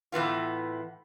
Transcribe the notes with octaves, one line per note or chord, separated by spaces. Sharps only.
A2 E3 B3 F4